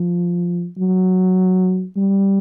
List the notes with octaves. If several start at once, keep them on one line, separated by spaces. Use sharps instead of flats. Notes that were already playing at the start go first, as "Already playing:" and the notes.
Already playing: F3
F#3
G3